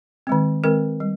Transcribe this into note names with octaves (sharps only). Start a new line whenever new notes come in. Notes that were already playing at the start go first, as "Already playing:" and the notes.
D#3 G#3 C4
D#3 G#3 C4 A#4
G3